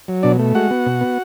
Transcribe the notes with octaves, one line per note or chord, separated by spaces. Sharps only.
F#3
B2 D4 D5
A3
G#3 F#4 F#5
B3
B2
B3